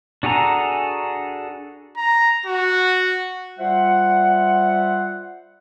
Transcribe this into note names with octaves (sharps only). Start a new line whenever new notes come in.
D4 F#4 G#4 A4 A#5
A#5
F#4
G3 F4 C5 E5 F#5